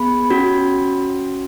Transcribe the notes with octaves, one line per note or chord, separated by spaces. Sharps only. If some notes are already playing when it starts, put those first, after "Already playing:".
Already playing: B3 G#4 B5
C#4 F#4